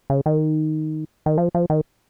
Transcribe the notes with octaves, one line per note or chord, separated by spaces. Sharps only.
C#3
D#3
D#3
F3
F3
D#3